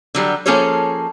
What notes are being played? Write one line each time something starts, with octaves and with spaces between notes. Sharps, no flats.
D3 F#3 G3
F3 A#3 C#4 G#4 A4 C#5